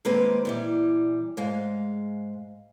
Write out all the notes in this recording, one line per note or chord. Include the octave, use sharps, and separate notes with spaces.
D#3 G#3 A#3 C4 G4 B4
A#2 E3 G3
G#2 G#3 F5